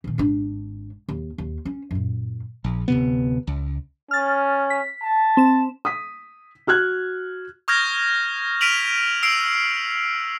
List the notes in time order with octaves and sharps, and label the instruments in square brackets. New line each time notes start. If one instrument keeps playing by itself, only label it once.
[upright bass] A#2 D#3
G#1 D4
D#2
D#2
C#4
F#2 A#2
[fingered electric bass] A#1
D1 C3 B3
C#2
[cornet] C#4 [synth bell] F6 A6
[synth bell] B6
[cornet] A5
[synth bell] C4 E7
[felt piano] D#6 B6
F#4 F6 F#6 G#6
[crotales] C#6 D#6 F6 G6 G#6 A#6
F6 B6 D7 D#7 F7 F#7
E6 C7 D7 F7